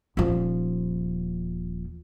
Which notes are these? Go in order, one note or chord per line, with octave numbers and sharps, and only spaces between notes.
D#1 F3